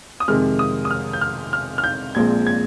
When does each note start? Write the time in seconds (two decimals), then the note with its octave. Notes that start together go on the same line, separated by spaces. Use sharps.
0.20 D#6
0.28 F2 C3 D#3 G#3 F6
0.59 D#6
0.85 D#6
0.91 F6
1.13 G6
1.21 F6
1.53 F6
1.78 F6
1.84 G6
2.15 A#1 A#2 G#3 C4 G#6
2.47 G#6